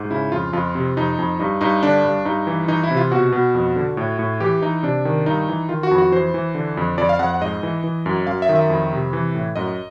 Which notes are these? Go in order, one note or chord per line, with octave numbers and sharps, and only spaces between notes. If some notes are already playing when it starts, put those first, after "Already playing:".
Already playing: G#2
C#3 E4
F2 F4
F2 F4
C3
F2 D#4
F2
G2 D#4
G2 D#4
D3 D4
G2
G2 D#4
E3
E3 D#4
E4
C3
F4
B2 F#4
B2
F2
D3
A2
A2
E3 G4
E3 D#4
C3 D4
D#3
G2 D#4
E3
D#3 F4
F#4
F2
F#4
E3 C5
E3
D3
F2
F2 D5
F5
F2 F#5
F#5
G#2 D#5
E3
E3
F#2
F#2 F5
E5
D#3
E5
F2
C3
E3
A2
F#2 D#5